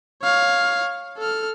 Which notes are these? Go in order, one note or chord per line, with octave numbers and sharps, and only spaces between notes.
C#5 F5
A4 F6